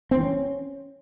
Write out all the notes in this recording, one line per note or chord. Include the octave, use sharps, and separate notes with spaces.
C4
E3
C#4